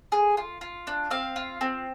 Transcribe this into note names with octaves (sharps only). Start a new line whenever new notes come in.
G#4
F4
F4
D4
C4 F5
F4
C4